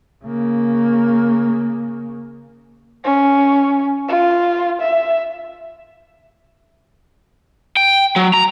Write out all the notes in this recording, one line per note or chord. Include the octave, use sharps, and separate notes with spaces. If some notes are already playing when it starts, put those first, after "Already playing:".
C#3 A#3
C#4
F4
E5
G5
F#3
A#5